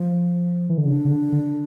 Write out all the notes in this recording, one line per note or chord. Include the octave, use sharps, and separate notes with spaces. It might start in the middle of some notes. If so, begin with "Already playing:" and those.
Already playing: F3
E3
D3
C#3 D4
C#3
D3
D3